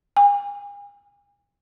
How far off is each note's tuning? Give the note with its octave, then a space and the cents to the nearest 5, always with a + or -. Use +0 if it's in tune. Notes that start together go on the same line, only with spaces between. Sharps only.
G#5 -40